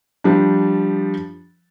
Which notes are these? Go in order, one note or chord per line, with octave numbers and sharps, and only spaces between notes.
F3 G3 D4